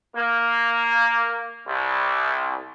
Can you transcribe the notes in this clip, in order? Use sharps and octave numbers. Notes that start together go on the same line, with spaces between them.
A#3
C2